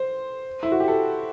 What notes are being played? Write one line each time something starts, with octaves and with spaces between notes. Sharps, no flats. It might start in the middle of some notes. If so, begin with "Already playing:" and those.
Already playing: C5
E4
F#4
G4
A4